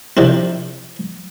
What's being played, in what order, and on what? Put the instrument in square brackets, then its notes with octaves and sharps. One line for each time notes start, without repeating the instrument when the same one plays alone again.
[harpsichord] C3 D#3 F3 D4 E4